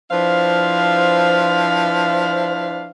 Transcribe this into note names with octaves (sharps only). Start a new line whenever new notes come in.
F3 D4 E4 B4 C5 F5